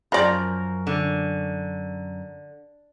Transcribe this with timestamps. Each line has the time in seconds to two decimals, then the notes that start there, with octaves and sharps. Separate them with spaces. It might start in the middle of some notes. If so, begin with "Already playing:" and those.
0.12 F#2 F3 A#4 D5
0.87 D3